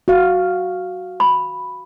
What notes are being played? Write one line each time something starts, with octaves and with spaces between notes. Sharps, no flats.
F#4 F5
B5